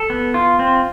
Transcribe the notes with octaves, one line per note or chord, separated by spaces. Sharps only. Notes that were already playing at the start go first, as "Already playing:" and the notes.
Already playing: A4
B3
F4
C4